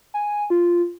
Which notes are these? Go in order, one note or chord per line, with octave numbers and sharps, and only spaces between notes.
G#5
F4